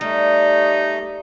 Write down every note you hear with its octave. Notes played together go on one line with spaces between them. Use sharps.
G3 A3 D#4